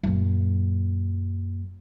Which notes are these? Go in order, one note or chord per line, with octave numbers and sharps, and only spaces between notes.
F#2 A#2